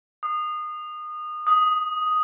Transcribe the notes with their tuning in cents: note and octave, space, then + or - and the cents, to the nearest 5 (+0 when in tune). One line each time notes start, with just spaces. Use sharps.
D#6 -25
D#6 +5